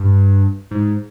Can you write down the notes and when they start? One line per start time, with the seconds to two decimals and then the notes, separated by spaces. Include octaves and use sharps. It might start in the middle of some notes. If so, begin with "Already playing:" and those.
Already playing: G2
0.71 G#2